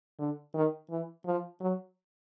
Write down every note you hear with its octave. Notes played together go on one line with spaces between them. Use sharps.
D3
D#3
E3
F3
F#3